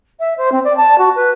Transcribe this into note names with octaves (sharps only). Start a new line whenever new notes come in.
E5
C5
C4
D5
A5
F#4
B4